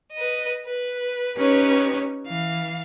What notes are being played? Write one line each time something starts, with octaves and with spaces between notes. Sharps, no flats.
B4 D#5
B4
C#4 D#4 G4 B4 C#5
E3 F5